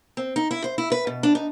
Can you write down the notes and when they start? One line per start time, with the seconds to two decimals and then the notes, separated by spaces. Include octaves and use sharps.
0.17 C4
0.36 D#4
0.51 E4
0.64 C5
0.78 E4
0.92 B4
1.07 B2
1.23 D4
1.35 D#4